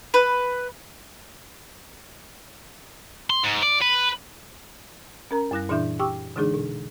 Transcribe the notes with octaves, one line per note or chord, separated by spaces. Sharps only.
B4
C6
G#2
D5
B4
C#4 A#4 A#5
F#2 G3 E4 F#6 A#6
A#2 E3 D4 E4 E5 G6
G4 G5 C#6 D6 E6
D3 E3 G#3 D4 D#4 G#4
B2